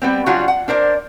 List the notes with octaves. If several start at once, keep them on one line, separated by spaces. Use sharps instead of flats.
G3 B3 C4
C#3 F#3 G3 D4 F4 F#4
F#5
D4 A#4 C5 D5